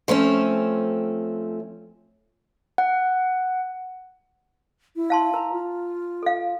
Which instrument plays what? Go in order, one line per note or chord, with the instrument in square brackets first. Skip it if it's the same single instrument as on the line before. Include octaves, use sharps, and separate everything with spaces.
[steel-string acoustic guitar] F3 A3 C4 C#4
[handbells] F#5
[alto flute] E4
[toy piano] F5 A5 C6
[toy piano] A#4 [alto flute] A#5
[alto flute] F4
[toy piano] A4 F5